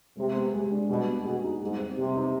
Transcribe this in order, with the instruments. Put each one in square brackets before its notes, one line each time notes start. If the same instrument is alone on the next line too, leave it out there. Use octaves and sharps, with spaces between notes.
[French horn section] C3 [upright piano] G#3
[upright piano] B3
G#3
D4
[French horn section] B2 [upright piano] G3
[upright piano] B3
[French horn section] B2 [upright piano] G#4
[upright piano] D#4
[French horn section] G#2 [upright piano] G3
[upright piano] C4
[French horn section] C3 [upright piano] G3
[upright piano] D#4